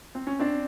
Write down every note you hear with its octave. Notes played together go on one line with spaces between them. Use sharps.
C4
C#4
C4 D4